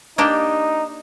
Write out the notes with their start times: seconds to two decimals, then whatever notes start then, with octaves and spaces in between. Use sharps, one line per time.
0.18 A#3 D4 D#4 G4